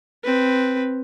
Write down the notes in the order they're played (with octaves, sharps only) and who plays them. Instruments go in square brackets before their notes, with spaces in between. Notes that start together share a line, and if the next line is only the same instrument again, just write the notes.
[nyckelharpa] C4 B4